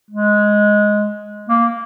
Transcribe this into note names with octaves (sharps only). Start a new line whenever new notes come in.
G#3
A#3